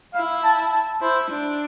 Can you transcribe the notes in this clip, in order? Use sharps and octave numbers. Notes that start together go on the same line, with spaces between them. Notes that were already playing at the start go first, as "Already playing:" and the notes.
E4 F5
A5
A5
E4 C5
D4